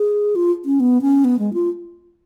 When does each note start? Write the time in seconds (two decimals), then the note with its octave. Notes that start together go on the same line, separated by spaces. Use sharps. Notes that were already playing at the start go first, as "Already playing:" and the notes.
Already playing: G#4
0.36 F4
0.65 C#4
0.80 B3
1.02 C#4
1.24 B3
1.39 G#3
1.53 F4